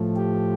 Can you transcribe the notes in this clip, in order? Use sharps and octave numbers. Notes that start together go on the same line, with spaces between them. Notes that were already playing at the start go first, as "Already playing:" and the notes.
Already playing: A2 F3 A3
G4